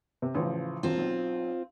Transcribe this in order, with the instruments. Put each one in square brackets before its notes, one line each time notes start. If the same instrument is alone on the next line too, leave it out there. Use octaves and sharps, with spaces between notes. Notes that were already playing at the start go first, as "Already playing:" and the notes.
[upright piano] C3
A1 C#3 F3
[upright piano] E1 [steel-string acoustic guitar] C4 F4
[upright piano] B1